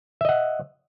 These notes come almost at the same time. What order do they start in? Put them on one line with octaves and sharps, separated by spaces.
E5 D#5 F#5